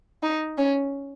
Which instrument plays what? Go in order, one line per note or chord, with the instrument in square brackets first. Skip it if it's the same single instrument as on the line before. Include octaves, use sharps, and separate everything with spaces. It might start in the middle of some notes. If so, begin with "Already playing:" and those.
[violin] D#4
C#4